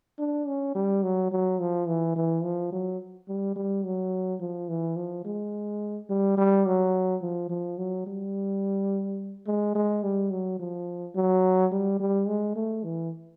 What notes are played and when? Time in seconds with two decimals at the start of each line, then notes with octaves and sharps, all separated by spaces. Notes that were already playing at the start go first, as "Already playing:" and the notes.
0.19 D4
0.47 C#4
0.75 G3
1.03 F#3
1.32 F#3
1.60 F3
1.88 E3
2.16 E3
2.43 F3
2.73 F#3
3.29 G3
3.56 G3
3.85 F#3
4.40 F3
4.69 E3
4.97 F3
5.25 G#3
6.10 G3
6.37 G3
6.66 F#3
7.22 F3
7.50 F3
7.78 F#3
8.07 G3
9.47 G#3
9.75 G#3
10.03 G3
10.31 F#3
10.60 F3
11.16 F#3
11.72 G3
12.00 G3
12.28 G#3
12.56 A3
12.84 E3